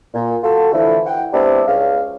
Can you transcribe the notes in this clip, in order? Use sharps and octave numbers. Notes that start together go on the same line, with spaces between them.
A#2
F4 F#4 A4
D3 E3 F3 A3 E4
F#5 G5
G3 B3 C4 D4 E4
C#2 C#5 F5